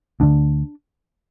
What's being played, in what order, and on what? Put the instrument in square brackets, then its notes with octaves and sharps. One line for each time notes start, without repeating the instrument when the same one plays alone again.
[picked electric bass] D2 D3 D4